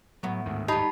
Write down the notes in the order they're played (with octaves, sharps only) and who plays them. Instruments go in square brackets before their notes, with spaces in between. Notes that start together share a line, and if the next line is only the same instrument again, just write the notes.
[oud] A2 B3 [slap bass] F#3
[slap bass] D2 G#2 D#3
[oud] G3 D#4 [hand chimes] G4 A5 B5